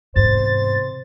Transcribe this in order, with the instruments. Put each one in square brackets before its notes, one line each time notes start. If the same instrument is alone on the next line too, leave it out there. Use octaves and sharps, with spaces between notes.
[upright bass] E2 G#2 [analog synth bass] C3 [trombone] C5 [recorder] A6